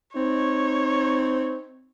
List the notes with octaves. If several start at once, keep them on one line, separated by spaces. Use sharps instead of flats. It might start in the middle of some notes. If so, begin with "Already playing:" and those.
C4 D#4 C#5